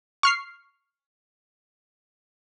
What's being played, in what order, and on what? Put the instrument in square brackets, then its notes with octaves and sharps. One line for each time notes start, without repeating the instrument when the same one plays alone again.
[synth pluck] C#6 F6 C7